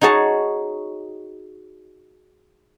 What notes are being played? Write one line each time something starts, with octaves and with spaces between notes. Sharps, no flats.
D#4 F#4 G#4 C#5 A5